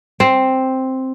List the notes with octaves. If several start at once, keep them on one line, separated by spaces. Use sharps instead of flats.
C4